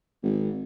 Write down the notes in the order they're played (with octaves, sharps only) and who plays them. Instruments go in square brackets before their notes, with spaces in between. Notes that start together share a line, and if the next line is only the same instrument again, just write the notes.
[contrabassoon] G#1